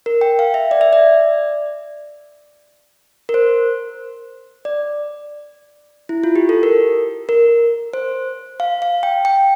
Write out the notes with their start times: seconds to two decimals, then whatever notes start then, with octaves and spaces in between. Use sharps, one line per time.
0.06 A#4
0.21 G5
0.39 F5
0.54 E5
0.71 D5
0.81 E5
0.93 D5
3.29 A#4
3.34 C5
4.65 D5
6.09 E4
6.24 F4
6.36 G4
6.49 A4
6.63 A#4
7.29 A#4
7.93 C5
8.60 F5
8.82 F5
9.03 G5
9.25 G5